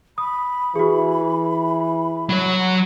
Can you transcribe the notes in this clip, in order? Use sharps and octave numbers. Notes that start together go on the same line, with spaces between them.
B5 D#6
E3 F#4 G#4
F#3 C#5